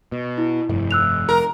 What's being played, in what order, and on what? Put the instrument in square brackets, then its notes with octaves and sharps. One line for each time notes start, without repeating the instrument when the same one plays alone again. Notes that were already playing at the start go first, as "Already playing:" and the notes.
[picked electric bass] B2
[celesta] E4
[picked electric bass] F1 [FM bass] G2
[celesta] E6 F#6 F7
[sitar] A#4